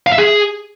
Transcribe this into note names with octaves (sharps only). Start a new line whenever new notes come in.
F5
E5
G#4